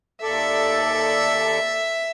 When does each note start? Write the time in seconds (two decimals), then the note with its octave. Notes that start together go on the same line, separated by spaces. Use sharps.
0.22 D#2 A4 D5 E5